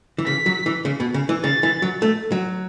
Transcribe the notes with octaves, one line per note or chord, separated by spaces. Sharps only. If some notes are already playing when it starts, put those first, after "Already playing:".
E3
C#3 B6
F#3
E3
C#3
B2
C#3
E3
C#3 A6
E3
F#3
A3
F#3